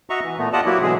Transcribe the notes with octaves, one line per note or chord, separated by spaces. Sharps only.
F#4 D#5 E5 A#5 C#6
E3
A#2 A3 B3
F4 G4 D5 D#5 F#5 A5
F#3 A#3 E4 F#4 G4
B2 D3 E3 F#3 G#3 G#4